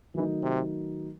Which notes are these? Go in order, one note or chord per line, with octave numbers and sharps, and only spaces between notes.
D#3 E3 F#3 A3 D#4
C3